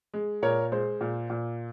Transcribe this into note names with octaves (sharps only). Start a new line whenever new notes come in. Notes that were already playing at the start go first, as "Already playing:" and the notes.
G#3
A#2 A#4 C#5
G#3 C5
A#2
A#2